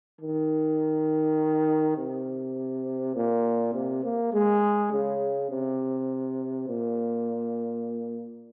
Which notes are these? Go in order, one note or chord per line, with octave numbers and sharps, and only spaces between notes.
D#3
C3
A#2
C3
A#3
G#3
C#3
C3
A#2